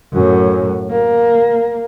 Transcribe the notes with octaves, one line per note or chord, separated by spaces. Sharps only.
F#2 A2
A#3